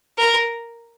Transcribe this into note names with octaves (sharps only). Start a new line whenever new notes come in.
A#4